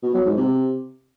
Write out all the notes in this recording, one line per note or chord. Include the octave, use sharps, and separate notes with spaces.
B2
F#3
G#2
C3